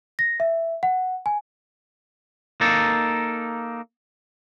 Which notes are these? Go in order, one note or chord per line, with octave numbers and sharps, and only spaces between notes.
A#6
E5
F#5
G#5
A#3 D#4 A4